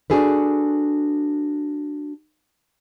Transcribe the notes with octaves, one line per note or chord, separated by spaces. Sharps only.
D4 D#4 F#4 G#4 A4 B4